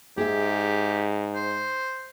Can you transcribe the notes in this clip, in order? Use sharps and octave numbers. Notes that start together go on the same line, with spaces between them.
G#2 G4 G#4 E5
C5